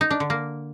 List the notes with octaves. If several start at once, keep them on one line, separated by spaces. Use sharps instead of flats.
D#4
D4
D3
A#3